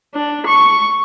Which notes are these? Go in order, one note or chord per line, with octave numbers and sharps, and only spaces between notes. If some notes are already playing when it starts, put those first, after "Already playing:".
D4
C#6